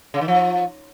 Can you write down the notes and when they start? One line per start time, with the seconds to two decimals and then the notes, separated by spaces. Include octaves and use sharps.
0.14 C#3
0.21 D#3
0.28 F3